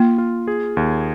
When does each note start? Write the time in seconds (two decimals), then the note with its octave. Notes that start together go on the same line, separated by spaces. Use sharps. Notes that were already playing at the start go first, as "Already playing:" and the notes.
Already playing: A#3 F4
0.18 F4
0.48 G#4
0.77 D#2